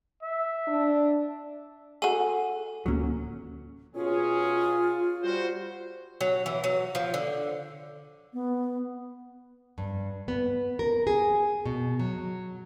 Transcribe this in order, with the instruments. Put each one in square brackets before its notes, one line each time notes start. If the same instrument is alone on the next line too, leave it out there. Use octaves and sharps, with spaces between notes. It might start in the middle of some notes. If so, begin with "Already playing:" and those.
[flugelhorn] E5
[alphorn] D4
[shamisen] F#4 G#4 [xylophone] A4 D#7
[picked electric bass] D1 A#3 [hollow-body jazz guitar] F#3 C#4
[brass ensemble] B2 C#4 G#4 [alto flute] F4
[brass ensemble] G3 F#4 C5
[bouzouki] F#3
E3
F#3
F3
D3
[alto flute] B3
[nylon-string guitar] G2
B3
A#4
G#4
B2
F#3